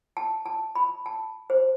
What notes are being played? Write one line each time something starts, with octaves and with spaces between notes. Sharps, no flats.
A5
A5
B5
A5
C5